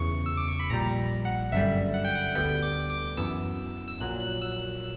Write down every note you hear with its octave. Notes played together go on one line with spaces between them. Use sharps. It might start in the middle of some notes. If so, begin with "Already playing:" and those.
Already playing: E2 C#3 E3 C#6
E6
D6
C#6
B5
A#1 A#2 G3 A#5
F#5
G1 F#2 D3 G3 E5
F#5
G5
F#5
D2 D3 G3 B3 G5
D6
D6
F#2 E3 B3 E6
E6
A#1 A#2 F#3 F#6
F#6
E6